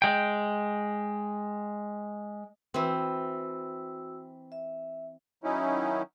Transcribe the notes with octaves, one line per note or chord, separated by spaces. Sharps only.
G#3 G5
E3 C4 F#4 E6
E5
D#3 F#3 C#4 D#4 E4